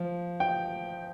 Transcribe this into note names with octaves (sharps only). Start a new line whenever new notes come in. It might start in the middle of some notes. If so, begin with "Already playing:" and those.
Already playing: F3
G5